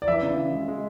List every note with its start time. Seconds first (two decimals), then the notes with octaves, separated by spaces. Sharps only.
0.02 D5
0.08 E3 E5
0.23 C#3
0.37 C#3
0.53 G#3
0.68 G#3